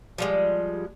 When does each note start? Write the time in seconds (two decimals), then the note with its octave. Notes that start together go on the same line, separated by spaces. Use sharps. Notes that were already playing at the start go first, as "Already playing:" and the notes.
0.18 F3 G3 G#3